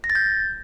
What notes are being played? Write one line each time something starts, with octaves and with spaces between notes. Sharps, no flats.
A#6
A6
G6